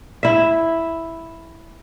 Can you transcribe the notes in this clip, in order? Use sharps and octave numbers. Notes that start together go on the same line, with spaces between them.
E4 E5